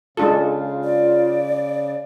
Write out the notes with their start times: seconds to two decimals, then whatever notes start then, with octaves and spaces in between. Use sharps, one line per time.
0.17 C#3 G#3 D4 F4 A4
0.84 D5